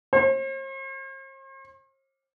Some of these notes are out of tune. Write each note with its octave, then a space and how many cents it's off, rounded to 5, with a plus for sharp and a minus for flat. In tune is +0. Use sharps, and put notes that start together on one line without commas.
C5 +45